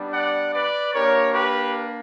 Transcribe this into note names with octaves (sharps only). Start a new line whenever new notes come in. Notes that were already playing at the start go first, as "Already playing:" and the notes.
Already playing: G3 B3 D4
D5 F#5
B4 D5
A#3 D4 G4 A#4 C#5
G4 B4